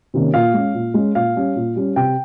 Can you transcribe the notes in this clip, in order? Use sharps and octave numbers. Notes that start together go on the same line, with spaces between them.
C3 D#3 A#3 C#4
A#2 F5
G#3 C#4
A#2
G#3 C#4
A#2 F5
G3 C#4
A#2
G3 C#4
C3 G5